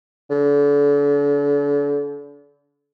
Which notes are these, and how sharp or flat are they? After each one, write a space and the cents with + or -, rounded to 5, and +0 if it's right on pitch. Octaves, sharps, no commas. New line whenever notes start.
D3 -35